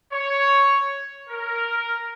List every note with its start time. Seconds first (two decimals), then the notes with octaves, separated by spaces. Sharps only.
0.12 C#5
1.28 A#4